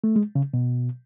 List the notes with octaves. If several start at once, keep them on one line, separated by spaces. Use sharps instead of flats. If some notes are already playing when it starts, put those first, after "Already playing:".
A3
G#3
C#3
B2